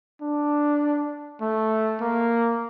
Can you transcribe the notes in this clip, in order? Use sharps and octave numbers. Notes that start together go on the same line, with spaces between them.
D4
A3
A#3